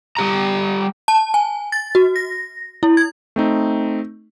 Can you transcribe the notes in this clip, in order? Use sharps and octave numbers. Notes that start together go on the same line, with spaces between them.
G3 G4 A#5
A5
G#5
A6
F#4
A#6
E4
G#6
A3 C4 D#4